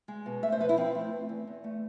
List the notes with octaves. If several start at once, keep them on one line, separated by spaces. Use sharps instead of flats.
G#3
B2
A3 E5
C5
F3 B4
E4
F3 C4
A3
A3
E2
E2
A3